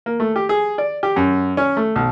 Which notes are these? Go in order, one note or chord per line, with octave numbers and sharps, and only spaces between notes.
A#3
A3
G4
G#4
D5
G4
F#2
C#4
A3
B1